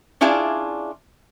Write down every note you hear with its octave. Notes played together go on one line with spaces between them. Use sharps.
C#4 D4 E4 F4 G#4 D5